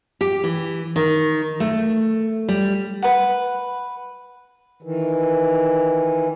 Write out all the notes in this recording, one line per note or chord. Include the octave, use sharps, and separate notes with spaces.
G4
E3
D#3
A3
G3
B4 F#5
D#3 E3